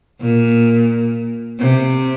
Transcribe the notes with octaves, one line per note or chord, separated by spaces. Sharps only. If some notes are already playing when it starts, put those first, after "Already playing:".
A#2
C3